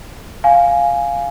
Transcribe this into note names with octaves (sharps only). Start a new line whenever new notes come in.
F5 G#5